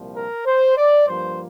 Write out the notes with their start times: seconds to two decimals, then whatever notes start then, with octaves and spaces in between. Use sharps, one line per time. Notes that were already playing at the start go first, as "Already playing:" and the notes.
Already playing: C2 A#2 F3
0.15 A#4
0.46 C5
0.77 D5
1.08 G2 F3 A#3 C5